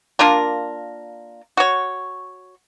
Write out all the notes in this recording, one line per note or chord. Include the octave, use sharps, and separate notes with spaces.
A#3 D4 F4 A#4
F#4 C#5